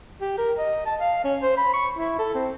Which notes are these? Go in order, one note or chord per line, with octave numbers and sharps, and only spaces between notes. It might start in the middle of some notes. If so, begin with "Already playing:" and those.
G4
A#4
D#5
A5
F5
C#4
C5
B5
C#6
E4
A4
C4